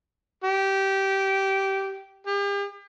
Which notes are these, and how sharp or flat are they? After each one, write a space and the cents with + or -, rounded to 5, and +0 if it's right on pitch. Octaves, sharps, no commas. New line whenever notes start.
G4 -15
G4 +40